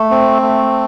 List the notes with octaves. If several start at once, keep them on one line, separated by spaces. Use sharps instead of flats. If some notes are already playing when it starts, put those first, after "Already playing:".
Already playing: A3
C4
A3